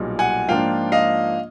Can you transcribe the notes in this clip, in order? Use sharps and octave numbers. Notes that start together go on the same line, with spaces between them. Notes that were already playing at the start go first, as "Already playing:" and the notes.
Already playing: B1 A#2 G3
F#5 G#5
G#2 F3 A#3 D4 F4 F5 G5
D#5 F5